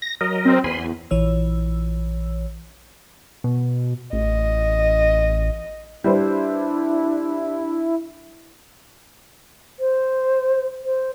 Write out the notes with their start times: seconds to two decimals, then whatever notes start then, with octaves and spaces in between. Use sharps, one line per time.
0.02 A#6
0.21 F#3 A#4 D#5
0.45 C4
0.64 E2 G#5 B5 C6
1.11 A#1 E3 C#5 E6
3.44 B2
4.13 A1 D#5
6.04 G3 D4 E4 B4 C5
9.80 C5
10.85 C5